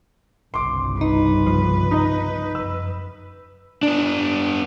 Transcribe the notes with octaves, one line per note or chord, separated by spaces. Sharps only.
G1 C2 C#3 C6 D6
D#4 B4
F3
D#4 D#5
F#2 E6
B3 D4